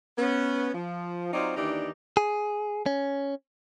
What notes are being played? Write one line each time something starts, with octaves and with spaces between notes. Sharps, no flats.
B3 C#4
F3
F#3 C4 D#4 F4 C5 D5
D#2 E3 D4 D#4 G4 D5
G#4
C#4